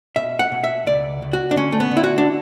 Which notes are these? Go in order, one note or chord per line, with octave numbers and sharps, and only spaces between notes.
B2 E5
F#5
B2
E5
C#2 D5
C#2
F#4
D4
D3 C#4
A3
B3
D3
E4
F#4
D4